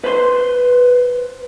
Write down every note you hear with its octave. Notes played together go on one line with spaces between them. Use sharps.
B4 C5 B5 C6